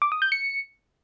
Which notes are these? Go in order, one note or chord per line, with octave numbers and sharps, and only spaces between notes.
D6
D#6
G6
C#7